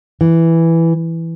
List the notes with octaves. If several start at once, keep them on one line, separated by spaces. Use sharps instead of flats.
E3